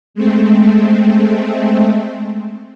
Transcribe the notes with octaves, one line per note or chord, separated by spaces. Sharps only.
G#3 A3 C4